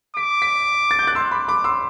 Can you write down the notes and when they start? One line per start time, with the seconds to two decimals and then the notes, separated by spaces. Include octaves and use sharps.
0.17 D6 B6 D7
0.42 B6 D7
0.91 A6
0.99 G6
1.07 F#6 A6
1.15 C6 E6
1.31 B5 D6
1.48 B5 D6
1.64 C6 E6